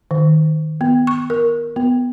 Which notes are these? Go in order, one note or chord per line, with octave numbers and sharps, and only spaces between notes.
D#3
B3
C#6
A#4
B3